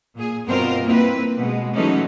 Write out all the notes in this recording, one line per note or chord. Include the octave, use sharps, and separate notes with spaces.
A#2 G#4
G2 B2 C4 F4 A#4 C5
A#3 C4 E4 B4
B2 G#3
E3 F#3 G#3 A3 C#4 D#4